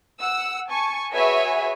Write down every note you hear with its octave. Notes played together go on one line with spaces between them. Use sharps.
F#5 E6
G#5 A5 C#6
F#4 G#4 B4 C#5 E5 G#5